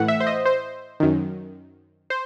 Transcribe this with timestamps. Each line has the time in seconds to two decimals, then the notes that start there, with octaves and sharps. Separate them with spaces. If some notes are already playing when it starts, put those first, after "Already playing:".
Already playing: A2 E3 F#5
0.08 E5
0.20 C5
0.27 D#5
0.45 C5
1.00 F#2 D#3
2.10 C5